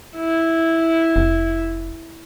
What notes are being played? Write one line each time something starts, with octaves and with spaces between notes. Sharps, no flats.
E4
F1